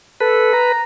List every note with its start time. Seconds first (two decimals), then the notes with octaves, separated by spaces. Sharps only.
0.20 A4 B4
0.53 A#5